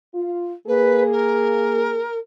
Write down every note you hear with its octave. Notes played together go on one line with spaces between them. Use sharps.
F4
A#3 G#4 B4
A#4